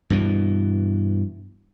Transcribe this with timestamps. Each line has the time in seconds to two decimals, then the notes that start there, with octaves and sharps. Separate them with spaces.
0.10 G2 B2 E3